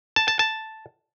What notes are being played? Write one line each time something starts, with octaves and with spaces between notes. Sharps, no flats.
A5
A5
A5